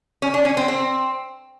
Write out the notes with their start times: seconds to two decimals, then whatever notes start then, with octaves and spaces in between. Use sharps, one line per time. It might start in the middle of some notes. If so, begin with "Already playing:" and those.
0.22 C#4
0.34 D4
0.45 C#4
0.57 C4
0.68 C4